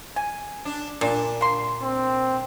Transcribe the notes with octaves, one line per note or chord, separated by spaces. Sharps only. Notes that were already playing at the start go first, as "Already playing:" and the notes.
G#5
D4
A#2 D4
A#3 C6
C4